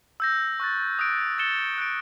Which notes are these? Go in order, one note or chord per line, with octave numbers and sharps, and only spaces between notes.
E6 G6 A#6
C#6 F#6 A6
D#6 F#6 A#6 D7
A6 C#7 E7 G7
F#6 A6 D7